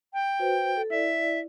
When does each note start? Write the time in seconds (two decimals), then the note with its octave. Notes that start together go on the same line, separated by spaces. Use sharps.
0.14 G5
0.39 F#4 B4 C5
0.77 A4
0.90 E4 D5 E5